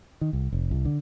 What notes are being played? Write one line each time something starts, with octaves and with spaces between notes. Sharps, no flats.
D#3
C2
F1
C2
D3